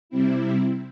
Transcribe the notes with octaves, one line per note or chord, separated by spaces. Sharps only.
C3 G3 C4 E4